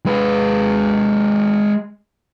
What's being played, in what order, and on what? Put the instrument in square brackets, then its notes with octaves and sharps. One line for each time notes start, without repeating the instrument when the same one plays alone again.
[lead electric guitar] G#3 B4